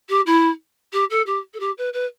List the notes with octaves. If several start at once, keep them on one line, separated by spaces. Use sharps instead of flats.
G4
E4
G4
A4
G4
A4
G4
B4
B4